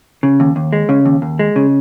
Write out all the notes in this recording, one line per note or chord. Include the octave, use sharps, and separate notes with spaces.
C#3
D#2
D#2
G#3
C#3
D#2
D#2
G#3
C#3